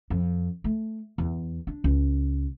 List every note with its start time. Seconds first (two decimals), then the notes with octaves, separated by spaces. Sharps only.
0.10 F2
0.64 A3
1.18 E2
1.67 D4
1.84 C#2